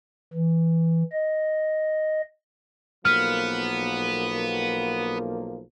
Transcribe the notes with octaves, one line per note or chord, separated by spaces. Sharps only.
E3
D#5
B1 F3 A#3 B3 F6